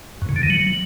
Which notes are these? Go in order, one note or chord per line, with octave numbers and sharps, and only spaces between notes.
F#2
C#3
D3
D#3
F#3